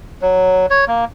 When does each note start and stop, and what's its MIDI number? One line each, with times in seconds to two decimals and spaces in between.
0.22 0.66 54
0.70 0.85 73
0.88 1.05 58